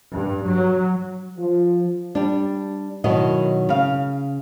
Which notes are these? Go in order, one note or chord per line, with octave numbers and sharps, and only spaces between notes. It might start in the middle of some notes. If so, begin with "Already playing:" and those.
G2
F#3
F3
G3 D4
B2 D#3 F#3 E4 D#5
C#3 F5